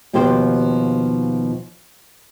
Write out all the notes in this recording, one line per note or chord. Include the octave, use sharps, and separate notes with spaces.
D#2 B2 F3 G4 C5